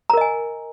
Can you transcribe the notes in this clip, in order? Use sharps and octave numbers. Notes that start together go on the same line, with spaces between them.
A#4 D#5 G#5 A#5